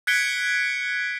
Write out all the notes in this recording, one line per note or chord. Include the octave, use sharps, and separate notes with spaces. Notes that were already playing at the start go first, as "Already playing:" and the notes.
F#6 G#6 B6 C#7 D7 G7